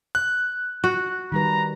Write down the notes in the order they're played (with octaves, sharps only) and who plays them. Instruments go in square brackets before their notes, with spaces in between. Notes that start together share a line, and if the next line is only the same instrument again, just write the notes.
[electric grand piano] F#6
[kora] F#4
[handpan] D#3 G3 B4 [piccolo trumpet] A#5